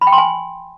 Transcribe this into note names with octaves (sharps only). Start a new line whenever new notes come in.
B5
G5
C6
G#5